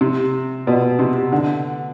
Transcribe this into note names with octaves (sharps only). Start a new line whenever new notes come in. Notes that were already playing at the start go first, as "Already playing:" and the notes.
C3
B2
C3
D3